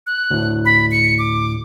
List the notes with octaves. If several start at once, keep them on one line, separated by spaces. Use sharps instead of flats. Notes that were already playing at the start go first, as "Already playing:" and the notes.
F#6
D2 A2
B5
C#7
D6